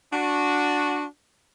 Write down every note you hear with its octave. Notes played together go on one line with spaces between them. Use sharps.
D4 F#4